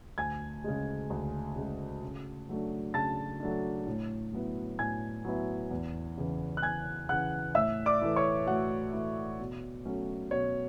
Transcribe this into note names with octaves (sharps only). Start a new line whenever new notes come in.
D2 G#5 G#6
C#3 G#3
D2
C#3 G#3
C#3
F#3 A3 D4
C#3 A5 A6
F#3 A3 D4
A2
F#3 B3 E4
A2 G#5 G#6
F#3 B3 E4
E2
C#3 E3
F#6
E2 G#5 G#6
C#3 E3 F#5 F#6
A2 E5 E6
D5 D6
E3 A3 E4
C#5 C#6
A2 F#4 F#5
E3 A3 E4
B2
F#3 A3 C#4
B2 C#5